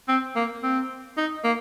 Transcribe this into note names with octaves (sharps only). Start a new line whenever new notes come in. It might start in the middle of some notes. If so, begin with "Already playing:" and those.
C4
A#3
C4
D#4
A#3